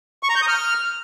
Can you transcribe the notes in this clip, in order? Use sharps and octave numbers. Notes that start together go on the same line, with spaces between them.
C#6
A#5
G6
D#6
F6